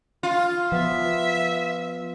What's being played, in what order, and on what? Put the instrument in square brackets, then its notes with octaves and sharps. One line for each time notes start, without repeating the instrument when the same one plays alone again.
[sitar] F4
[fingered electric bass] F3 [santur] B3 C6 [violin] E5